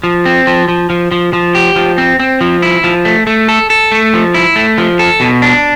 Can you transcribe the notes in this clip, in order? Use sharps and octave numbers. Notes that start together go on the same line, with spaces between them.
F3
C4
F3
F3
F3
F3
F3
G4
F3
C4
C4
F3
E4
F3
A3
A3
A4
A4
A3
F3
E4
A3
F3
A4
B2
D4